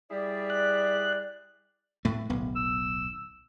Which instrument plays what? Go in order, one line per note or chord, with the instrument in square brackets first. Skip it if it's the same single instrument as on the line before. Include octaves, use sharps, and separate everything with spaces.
[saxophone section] G3 E4 G#4 [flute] D5
[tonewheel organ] F#6
[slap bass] A2 A3
D1 B1 B3
[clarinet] E6